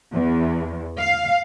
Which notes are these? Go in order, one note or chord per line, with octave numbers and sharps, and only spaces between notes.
E2
F5